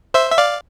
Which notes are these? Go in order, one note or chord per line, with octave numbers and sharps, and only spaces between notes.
C5 E5
E5
D5 F5